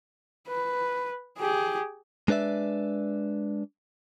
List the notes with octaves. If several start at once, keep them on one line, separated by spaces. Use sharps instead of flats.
B4
G4 G#4
G#3 D4 B4 D5 E5